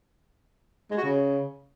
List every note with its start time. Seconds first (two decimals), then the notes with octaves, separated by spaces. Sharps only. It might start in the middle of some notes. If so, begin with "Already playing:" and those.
0.91 G#3
0.97 F#4
1.03 C#3